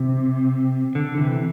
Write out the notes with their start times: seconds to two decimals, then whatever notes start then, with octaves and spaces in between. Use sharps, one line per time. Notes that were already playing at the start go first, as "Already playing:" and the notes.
Already playing: C3
0.95 D3
1.18 C3 E3